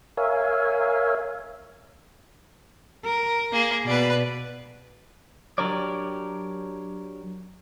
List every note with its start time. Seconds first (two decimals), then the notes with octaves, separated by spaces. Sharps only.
0.17 A#4 C#5 E5 F5 G#5
3.05 A#4
3.52 A#3 G#4
3.86 B2 B4 D5
5.58 F#3 D4 G4 A#4 C#5 D5